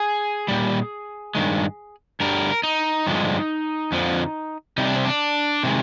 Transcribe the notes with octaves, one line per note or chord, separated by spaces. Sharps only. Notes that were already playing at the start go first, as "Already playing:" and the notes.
Already playing: G#4
A#2 G3
G2 D#3 G#3
G2 D3 G3 A#4
D#4
G2 D3 F3 G#3
F2 D3 F3
C3 G3 D#4
D4
C4
D4
C3 D#3 G#3